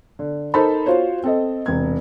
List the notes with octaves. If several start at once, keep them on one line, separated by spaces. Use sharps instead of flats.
D3
D#4 A4 A#4 C5 A5 B5
F4 F#4 C5 C#5
C4 A4 D#5
E1 C3 G#6